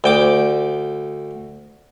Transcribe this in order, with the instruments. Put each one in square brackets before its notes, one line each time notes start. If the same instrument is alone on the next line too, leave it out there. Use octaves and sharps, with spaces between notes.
[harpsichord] D2 G5 D6